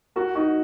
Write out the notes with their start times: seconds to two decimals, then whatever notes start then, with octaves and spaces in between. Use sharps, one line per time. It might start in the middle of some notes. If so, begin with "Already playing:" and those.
0.16 F#4 A#4
0.35 D#4 F#4